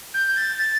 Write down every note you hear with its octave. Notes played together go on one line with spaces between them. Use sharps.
G6
G6
A6
A6